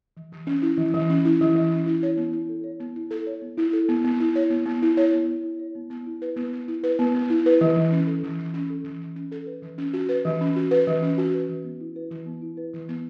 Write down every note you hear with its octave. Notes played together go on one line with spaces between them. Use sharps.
E3
E3
C#4
E4
E3
E3
C#4
E4
E3
E3
C#4
E4
C#5
B3
E4
A4
C#5
B3
E4
A4
C#5
B3
E4
A4
B3
B3
E4
C#5
B3
B3
E4
C#5
B3
B3
E4
C#5
B3
B3
E4
B4
B3
B3
E4
B4
B3
B3
E4
B4
E3
E3
C#4
A4
E3
E3
C#4
A4
E3
E3
C#4
A4
B4
E3
C#4
F#4
B4
E3
C#4
F#4
B4
E3
C#4
F#4
B4
E3
B3
E4
B4
E3
B3
E4
B4
E3
B3